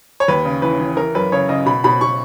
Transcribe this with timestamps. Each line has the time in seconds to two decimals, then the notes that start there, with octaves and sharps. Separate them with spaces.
0.20 C#5
0.28 D#2 B4
0.45 C#3
0.62 E3 B4
0.79 E3
0.97 E3 A#4
1.15 F#2 B4
1.32 C#3 C#5
1.49 C#3 D#5
1.66 B2 B5
1.84 B2 B5
2.01 B2 C#6